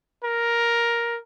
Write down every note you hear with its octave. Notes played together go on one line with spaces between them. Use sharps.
A#4